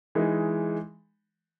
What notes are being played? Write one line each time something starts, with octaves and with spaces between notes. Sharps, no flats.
E3 G#3 D#4